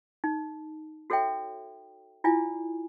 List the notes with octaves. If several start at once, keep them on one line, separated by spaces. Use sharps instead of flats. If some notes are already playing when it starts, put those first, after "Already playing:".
D#4
F#4 A4 C#5 E5 G5
E4 F4 D5 G#5